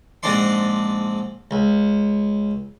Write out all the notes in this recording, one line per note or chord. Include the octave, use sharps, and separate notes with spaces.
A#1 G#2 C4 D4 D5 C6
C#2